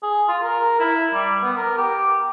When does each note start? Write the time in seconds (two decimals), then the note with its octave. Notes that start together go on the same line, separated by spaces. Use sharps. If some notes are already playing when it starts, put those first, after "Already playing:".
0.03 G#4
0.28 F4
0.43 A#4
0.80 E4
1.14 G3
1.43 B3
1.57 A#4
1.78 G4